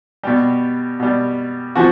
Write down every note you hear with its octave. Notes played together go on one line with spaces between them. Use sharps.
B2 G3 G4
B2 G3
C3 F3 F#4